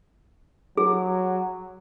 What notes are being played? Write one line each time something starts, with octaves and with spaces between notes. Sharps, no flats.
F#3 G#4